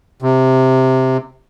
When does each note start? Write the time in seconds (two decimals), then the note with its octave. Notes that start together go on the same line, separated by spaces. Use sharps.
0.22 C3